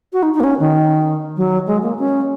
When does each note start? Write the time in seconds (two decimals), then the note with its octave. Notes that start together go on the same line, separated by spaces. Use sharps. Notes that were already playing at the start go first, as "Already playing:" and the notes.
0.13 F#4
0.23 D#4
0.34 D#4
0.40 A#3
0.44 C#4
0.60 D#3
1.37 F#3
1.67 G#3
1.83 A#3
1.99 C#4